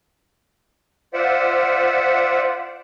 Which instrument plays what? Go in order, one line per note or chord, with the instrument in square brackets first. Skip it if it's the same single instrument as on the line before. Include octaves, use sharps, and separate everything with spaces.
[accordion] F4 C5 D5 E5 F#5